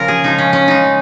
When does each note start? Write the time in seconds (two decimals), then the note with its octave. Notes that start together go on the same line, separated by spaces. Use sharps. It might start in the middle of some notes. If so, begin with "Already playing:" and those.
Already playing: C#3 F3 F4 A#4
0.08 G#4
0.24 C#3 F3 G#3 D#4
0.38 C#4
0.53 C#4
0.68 C#3 G#3 D#4